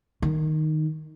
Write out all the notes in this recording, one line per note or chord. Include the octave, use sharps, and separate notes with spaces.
D#3